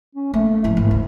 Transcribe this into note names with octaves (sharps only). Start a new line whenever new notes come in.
C#4
A3 A#3
A2 F3 E4
G#1
D2